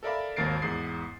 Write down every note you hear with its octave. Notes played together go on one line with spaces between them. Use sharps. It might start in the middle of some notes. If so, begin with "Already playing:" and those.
A4 A#4 D5 E5 F5 B5
G#1 D#2 A#4 A6 C7 D7
E2 G#2 D#6 C7